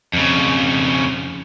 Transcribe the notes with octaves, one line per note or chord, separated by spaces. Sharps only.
F2 C#3